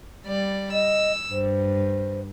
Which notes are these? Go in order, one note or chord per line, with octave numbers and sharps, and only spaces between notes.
G3 D5
D#5 E6
G2 C5